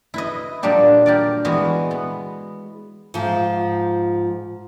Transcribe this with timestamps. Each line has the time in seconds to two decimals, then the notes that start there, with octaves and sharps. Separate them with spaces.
0.14 E4 B4 D#5
0.63 A#2 F#3 G3 A#3 D4 G4
1.06 G4 A#4 D5
1.45 E3 G#3 B3 F#4
1.91 B3
3.14 G#2 F3